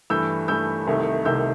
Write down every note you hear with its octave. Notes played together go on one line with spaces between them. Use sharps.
G2 E3 A3 E6 G6
G2 E3 A3 E6 G6
C2 C3 D#3 A3
C2 C3 D#3 A3 E6 G6